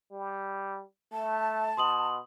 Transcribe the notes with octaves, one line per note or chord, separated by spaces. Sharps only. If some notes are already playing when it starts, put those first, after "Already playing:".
G3
A3 A5
B2 C6 D#6 F#7